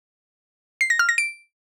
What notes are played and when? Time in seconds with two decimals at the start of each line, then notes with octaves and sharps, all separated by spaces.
0.81 C7
0.90 A#6
0.99 F6
1.09 A#6
1.18 D7